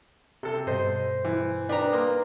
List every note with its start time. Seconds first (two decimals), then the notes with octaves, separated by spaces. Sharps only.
0.43 C3 G4 A4
0.67 G2 B2 C5 D#5
1.25 E3
1.69 D#3 D4 B4 A#5
1.93 A#3 C6 D#6